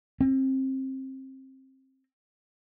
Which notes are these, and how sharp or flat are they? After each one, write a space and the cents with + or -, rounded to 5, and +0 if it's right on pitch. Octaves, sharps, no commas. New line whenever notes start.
C4 +25